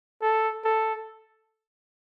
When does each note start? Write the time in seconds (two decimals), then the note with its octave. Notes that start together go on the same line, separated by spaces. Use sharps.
0.22 A4
0.64 A4